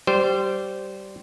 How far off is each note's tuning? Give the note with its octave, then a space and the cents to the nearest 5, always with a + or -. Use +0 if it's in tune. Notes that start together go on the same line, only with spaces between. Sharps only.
G3 -15 C5 -15